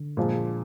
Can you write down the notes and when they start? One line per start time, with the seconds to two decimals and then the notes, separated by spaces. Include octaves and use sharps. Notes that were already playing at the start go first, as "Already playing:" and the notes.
Already playing: D3
0.17 A#2 F3 G#3